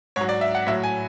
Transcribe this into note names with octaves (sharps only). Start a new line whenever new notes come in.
G#2 F#3 C#5
D5
E5
F#5
A2 F#3 E5
G#5